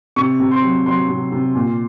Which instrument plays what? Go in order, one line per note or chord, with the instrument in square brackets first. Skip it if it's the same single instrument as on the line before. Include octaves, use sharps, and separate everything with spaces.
[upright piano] C3 C#6
C3
C6
F#3
F#3 C6
C3
C3
A#2